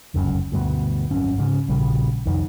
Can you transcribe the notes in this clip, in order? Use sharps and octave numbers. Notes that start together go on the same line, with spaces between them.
F1 C#2 F#2
D2 G2 B2
G#1 F#2 C4 C#4
G#2 C#3
A#1 C#3 G3
C2 F2 D#3